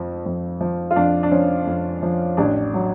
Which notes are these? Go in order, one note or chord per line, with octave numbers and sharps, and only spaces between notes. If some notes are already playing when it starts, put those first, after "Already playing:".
Already playing: F2 F3
F2
F3
F4
F2 D4
D4
F3 C#4
F2
F3
A1 D4
F#3